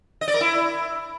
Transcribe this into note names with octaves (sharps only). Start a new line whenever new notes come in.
D#5
D5
A#4
E4